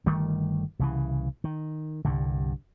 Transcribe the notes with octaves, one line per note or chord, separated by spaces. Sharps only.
G1 D#3 G3 A3
C2 C#3 E3
D#3
C2 G2 D3